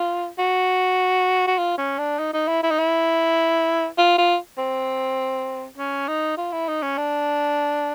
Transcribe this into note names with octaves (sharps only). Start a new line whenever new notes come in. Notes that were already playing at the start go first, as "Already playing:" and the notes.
Already playing: F4
F#4
F#4
F4
C#4
D4
D#4
D#4
E4
E4
D#4
E4
F4
F4
C4
C#4
D#4
F4
E4
D#4
C#4
D4